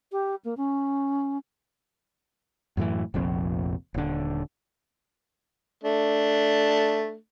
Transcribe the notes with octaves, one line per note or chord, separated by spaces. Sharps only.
G4
A#3
C#4
F#2 A2 C3 E3
F1 A#1 F2
D#1 D3
A3 D4